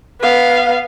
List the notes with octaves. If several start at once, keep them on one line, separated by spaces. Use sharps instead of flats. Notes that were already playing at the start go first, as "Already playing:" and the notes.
B3 F5